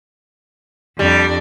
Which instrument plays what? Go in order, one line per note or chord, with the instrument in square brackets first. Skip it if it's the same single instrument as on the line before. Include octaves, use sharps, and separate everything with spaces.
[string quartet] F2 D4 [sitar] G3